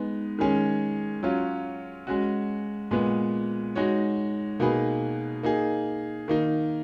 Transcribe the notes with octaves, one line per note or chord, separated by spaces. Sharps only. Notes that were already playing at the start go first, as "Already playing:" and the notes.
Already playing: G#3 B3 D#4
D#3 G#3 C#4 G#4
F#3 C#4 F4
G#3 C#4 F#4
A#2 G#3 B3
G#3 D#4 F#4 C#5
B2 A#3 D#4 G#4 B4
A#3 D#4 G#4
D#3 A#3 D#4